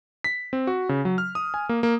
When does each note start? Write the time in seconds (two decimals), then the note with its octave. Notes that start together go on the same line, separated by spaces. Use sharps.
0.24 B6
0.53 C4
0.67 F#4
0.89 C#3
1.05 F#3
1.18 F6
1.35 D#6
1.54 G#5
1.69 A#3
1.83 A#3